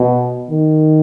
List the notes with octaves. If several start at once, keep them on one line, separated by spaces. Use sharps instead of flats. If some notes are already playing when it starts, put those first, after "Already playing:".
Already playing: B2
D#3